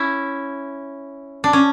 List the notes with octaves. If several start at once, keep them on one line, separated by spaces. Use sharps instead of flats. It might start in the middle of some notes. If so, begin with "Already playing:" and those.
Already playing: C#4 E4
D4
C#4